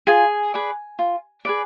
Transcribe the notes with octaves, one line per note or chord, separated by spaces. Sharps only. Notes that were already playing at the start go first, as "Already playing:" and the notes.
F4 G#4 G#5
G#4 B4 D5
F4
G#4 B4 D5